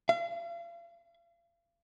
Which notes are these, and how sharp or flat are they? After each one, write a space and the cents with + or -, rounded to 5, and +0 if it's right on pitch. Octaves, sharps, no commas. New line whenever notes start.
F5 -40